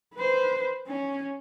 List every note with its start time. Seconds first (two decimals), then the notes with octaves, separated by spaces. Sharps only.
0.15 B4 C5
0.87 C#4